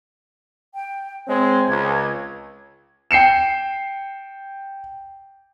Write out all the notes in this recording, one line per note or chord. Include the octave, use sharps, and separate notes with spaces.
G5
G#3 C4 C#5
C#2 G#6
G5 C7 C#7 E7